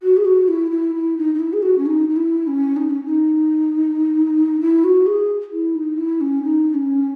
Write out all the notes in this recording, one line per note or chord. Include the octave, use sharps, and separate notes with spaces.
F#4
G#4
F#4
E4
E4
E4
D#4
D#4
E4
G#4
F#4
C#4
D#4
D#4
E4
C#4
D#4
C#4
D#4
E4
F#4
G#4
E4
D#4
E4
C#4
D#4
C#4